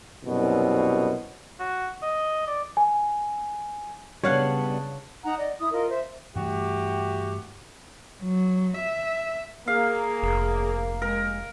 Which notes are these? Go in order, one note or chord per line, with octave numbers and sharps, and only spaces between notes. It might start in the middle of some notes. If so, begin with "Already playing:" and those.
C2 F#2 B2
F#4
D#5
D5
G#5
C#3 G3 B3 D4 C#5 F5 F#5
D#4 F#5 A#5
D5 D#5
E4 D#6
F4 A#4 D#5
C5 E5
G2 E3 A3 E4 F#4 G4
F#3
E5
A#3 G#4 F5
F1
G#3 A#4